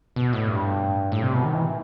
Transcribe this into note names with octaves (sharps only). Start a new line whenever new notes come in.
B2
A2
G2
A2
C3
B2
D#3
E3